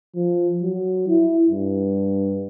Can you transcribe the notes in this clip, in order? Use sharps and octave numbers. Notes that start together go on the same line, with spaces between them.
F3
F#3
E4
G2